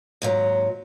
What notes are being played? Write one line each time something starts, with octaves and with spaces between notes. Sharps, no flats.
D#2 G#2 F#3